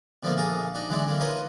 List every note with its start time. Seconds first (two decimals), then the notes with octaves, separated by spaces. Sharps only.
0.23 B2 D3 F3 F#3 A3 A#3
0.37 A#1 A#3 G#4 A4 A#5
0.74 D4 D#4 F#4
0.89 D3 E3 F#3 G#3 D4 E4
1.06 D3 F#3 A#3
1.20 D#4 F4 A#4 B4 C#5 D#5